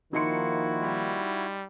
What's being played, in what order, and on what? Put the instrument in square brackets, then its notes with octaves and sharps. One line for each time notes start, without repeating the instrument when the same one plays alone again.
[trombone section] D#3 F3 A#3 [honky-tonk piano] D#4 C6 C#7 [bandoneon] E4 F#4
[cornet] G3